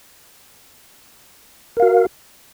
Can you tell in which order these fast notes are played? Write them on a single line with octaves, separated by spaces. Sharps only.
A#4 F5 F#4